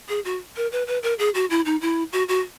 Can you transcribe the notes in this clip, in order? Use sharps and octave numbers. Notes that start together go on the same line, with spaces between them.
G#4
F#4
A#4
B4
B4
A#4
G#4
F#4
E4
D#4
E4
F#4
F#4